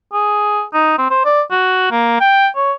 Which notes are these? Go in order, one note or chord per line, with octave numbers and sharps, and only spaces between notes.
G#4
D#4
C4
C5
D5
F#4
A#3
G5
C#5